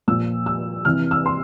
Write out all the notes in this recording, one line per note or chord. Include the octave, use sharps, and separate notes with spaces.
A#2 F3 E6
E6
C3 E3 F6
E6
C6